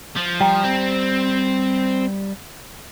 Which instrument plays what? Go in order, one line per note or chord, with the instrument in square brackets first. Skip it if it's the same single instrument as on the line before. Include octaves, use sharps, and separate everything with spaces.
[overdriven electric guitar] F3
[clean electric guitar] G3 [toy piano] G5 A#5
[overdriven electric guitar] C4